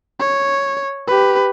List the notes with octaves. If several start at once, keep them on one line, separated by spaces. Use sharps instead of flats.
C#5
G4 B4